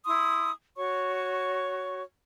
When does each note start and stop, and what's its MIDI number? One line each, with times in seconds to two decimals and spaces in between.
0.06 0.50 64
0.06 0.50 84
0.06 0.50 87
0.76 2.02 66
0.76 2.02 73
0.76 2.02 85